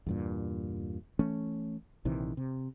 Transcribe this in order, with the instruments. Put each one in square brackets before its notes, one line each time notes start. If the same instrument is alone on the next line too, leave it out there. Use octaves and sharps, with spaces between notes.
[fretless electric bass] E2 G2 A#2
E3 A3 C#4
A#1 C3 D#3 E3
C3